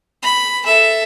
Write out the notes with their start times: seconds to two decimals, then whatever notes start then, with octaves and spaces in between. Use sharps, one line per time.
0.23 B5
0.65 A4 E5